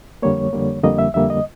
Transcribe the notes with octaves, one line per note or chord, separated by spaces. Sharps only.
F2 D3 G3 A#3 C#5
F2 D3 G3 A#3
F2 D3 G3 A#3 D#5
E5
F2 D3 G3 A#3 E5
D#5